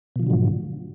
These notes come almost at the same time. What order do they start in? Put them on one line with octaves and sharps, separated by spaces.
B2 F3 D3 F#3 G#2